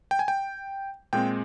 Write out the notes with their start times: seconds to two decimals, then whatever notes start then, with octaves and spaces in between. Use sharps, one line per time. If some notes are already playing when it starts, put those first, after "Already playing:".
0.11 G5
0.19 G#5
0.28 G5
1.13 A#2 G#3 C4 G5